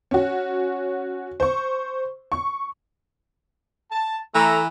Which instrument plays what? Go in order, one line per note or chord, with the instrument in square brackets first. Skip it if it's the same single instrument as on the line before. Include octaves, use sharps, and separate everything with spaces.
[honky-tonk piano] C#4 F#4
C5 C#6
C#6
[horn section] A5
[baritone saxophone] E3 [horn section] A3 A#5